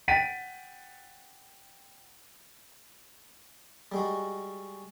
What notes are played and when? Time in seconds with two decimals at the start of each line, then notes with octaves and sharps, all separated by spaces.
0.08 F#5 G5 A6 B6 D7 D#7
3.92 G3 G#3 F#4